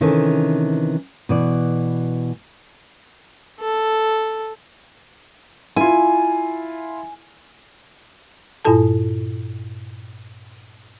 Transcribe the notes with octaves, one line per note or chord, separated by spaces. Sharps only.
C3 D#3 E3 C#4 A4
B2 E3 D5
A4
E4 F4 G#5
G2 A#2 E4 F4 A4 A5